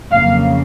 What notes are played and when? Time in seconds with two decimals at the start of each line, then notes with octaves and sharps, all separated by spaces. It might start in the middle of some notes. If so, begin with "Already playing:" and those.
0.12 F2 C#3 F#3 A#3 F5